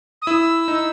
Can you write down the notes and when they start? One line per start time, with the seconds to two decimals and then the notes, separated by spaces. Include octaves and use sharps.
0.22 D#6
0.27 E4 E6
0.68 D#4